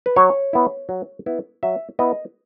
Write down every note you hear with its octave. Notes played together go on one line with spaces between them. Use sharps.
B4
F#3 C#5
B3 E4
F#3
B3 E4
F#3 E5
B3 E4 D#5